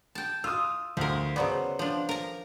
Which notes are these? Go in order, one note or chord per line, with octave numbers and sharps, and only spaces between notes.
G5 A5
F4 D#6 E6
D2 F3 A#4
C#3 F#3 B3 C5 D5
F3 D4
A#4 A#5